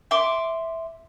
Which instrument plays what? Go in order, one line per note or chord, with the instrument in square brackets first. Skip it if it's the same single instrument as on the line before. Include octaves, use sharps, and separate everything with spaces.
[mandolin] E5 C6 D6